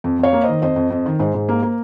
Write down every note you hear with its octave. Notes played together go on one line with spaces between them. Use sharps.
F2
F2 C#5 F5
A#3
D#3 C5 D#5
F2 C5 D#5
F2
F2
D#3
G#2 C5
G#2
A#3
A#3